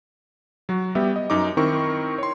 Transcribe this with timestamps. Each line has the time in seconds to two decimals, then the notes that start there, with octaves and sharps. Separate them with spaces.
0.69 F#3 F#4
0.95 G3 B3 G4 E5
1.16 D#5
1.30 F#2 D#4 A#5 D6
1.57 D#3 C4 E4 A#4 C#6
2.18 C#5 C6